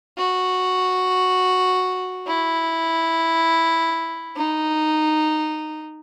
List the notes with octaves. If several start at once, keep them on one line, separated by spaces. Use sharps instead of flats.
F#4
E4
D#4